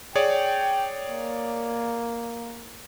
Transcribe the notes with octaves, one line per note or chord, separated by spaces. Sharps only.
G#4 C#5 D5 G5
A#3